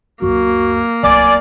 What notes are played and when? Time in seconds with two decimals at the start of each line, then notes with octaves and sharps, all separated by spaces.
0.22 C#2 F#2 A#3 F#4
1.03 D1 C2 D5 G#5